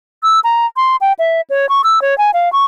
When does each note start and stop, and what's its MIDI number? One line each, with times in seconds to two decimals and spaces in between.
0.23 0.40 88
0.44 0.66 82
0.76 0.96 84
1.01 1.13 79
1.19 1.41 76
1.50 1.69 73
1.69 1.82 85
1.84 2.02 88
2.02 2.17 73
2.18 2.31 80
2.34 2.51 77
2.52 2.65 85